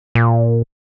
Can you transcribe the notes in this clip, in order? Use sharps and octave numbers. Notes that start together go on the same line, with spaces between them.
A#2